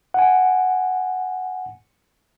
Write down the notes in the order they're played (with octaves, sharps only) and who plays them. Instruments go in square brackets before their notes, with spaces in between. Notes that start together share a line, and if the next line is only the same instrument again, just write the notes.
[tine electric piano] F#5 G#5